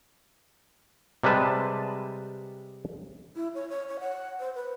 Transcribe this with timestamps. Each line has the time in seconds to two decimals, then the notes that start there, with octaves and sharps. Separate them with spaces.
1.24 C3 G3 G#3 B4 A5
3.36 E4
3.54 C#5
3.70 C#5
3.89 C#5
4.00 F#5
4.40 C5
4.55 B4